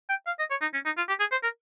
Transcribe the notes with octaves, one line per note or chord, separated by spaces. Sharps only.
G5
F5
D#5
C#5
D#4
C#4
D#4
F4
G4
G#4
C5
A#4